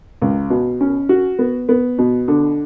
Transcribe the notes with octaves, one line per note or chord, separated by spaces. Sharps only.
C#2
B2
C#4
F#4
B3
B3
B2
D3